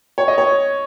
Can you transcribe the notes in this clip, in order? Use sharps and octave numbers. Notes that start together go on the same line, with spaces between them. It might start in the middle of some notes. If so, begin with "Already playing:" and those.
C#5
D#5
C#5